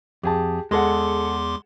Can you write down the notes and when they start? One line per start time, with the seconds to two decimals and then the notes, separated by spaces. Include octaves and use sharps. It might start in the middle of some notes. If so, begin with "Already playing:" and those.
0.23 F2 G4 G#4 A5
0.71 E2 G#3 G#4 A4 F#5 C6 D6